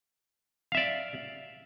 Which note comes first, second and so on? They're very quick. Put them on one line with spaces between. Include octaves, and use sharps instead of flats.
F5 E5 D5